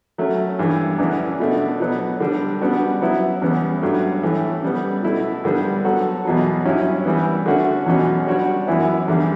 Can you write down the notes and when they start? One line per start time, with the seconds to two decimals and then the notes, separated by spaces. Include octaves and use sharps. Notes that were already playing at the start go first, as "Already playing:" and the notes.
0.18 F#3 A3 C#4
0.59 G2 E3 A3
0.98 E2 C#3 E3 B3 D4
1.40 B2 A3 D4
1.80 B2 F#3 B3
2.20 D3 G3 D4
2.61 C#3 G3 B3 D4 F#4
3.02 F#3 B3 E4
3.42 E2 C#3 G3 B3
3.82 G2 F#3 A3
4.23 A2 E3 A3
4.63 C#3 G3 B3
5.03 B2 A3 E4
5.44 G2 D3 G3 B3
5.84 F#3 B3 F#4 A4
6.25 E2 B2 F#3
6.65 G2 F#3 C#4 E4
7.05 E3 G3 B3
7.46 D3 A3 C#4 F#4
7.86 E2 B2 F#3 C#4
8.27 G3 D4 F#4 C#5
8.67 F#2 E3 B3 E4
9.08 E2 D3 G3